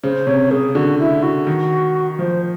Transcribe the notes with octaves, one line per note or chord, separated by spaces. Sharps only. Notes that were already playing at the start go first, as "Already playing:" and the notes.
C#3 C5
C3 C#5
C#3 G#4
D3 F#4
E4
F#4
D#3
F3 C5